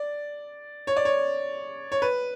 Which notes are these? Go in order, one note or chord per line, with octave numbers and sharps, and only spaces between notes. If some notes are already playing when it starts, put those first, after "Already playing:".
Already playing: D5
C#5
D5
C#5
C#5
B4